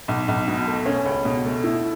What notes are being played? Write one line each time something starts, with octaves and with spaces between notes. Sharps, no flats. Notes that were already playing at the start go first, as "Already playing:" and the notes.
B1
B1
B2
A3
C#4
C#2
B2
A3
E4